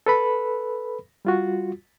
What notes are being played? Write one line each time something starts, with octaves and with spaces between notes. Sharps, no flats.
A4 B4 B5
G3 F4 F#4